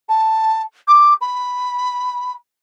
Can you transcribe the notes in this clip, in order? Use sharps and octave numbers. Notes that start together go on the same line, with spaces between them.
A5
D6
B5